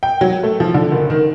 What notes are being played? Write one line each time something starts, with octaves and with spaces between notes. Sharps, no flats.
G5
F#3
A3
F3
D3
F#1
D#3